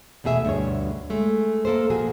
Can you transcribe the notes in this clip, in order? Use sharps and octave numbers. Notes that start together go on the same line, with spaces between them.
E2 B2 A3 G#4 E5
D2 G2 B2 C#5
G#3 A3
A#3 A4 A#4 C5
A#2 F3 F#4 G#4